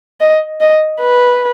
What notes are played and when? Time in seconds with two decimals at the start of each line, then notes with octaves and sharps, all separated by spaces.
0.20 D#5
0.60 D#5
1.00 B4